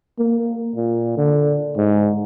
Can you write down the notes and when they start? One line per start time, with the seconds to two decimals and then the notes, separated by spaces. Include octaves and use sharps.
0.19 A#3
0.76 A#2
1.17 D3
1.77 G#2